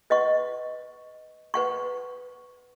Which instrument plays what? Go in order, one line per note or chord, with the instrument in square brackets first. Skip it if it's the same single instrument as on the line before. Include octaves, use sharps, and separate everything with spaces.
[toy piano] B4 D#5 F#5 C#6
B4 F#5 C#6